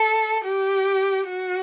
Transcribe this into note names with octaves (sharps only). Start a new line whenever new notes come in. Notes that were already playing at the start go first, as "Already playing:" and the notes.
Already playing: A4
G4
F#4